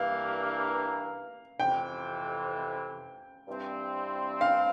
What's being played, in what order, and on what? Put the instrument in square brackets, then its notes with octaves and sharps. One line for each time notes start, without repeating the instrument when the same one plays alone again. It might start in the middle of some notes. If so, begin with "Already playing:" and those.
Already playing: [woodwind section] G2 E3 A#3 [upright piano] F5
[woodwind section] F2 C3 E3 [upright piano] G5
[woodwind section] G2 E3 G3 C4
[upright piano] F5